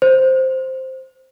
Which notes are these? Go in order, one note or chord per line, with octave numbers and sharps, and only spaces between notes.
C5